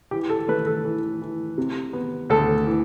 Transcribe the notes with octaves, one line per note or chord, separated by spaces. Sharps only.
E3 G4
A4
A3 B4
A4
E3
E3
C3
B3
D2 A4
E3